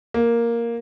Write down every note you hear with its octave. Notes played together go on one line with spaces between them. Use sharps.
A#3